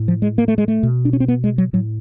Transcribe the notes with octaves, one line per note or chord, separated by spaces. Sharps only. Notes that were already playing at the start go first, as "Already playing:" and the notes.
Already playing: A2
F3
G#3
A#3
A3
G#3
A3
B2
D4
C#4
C4
B3
G#3
F#3
A2 F#3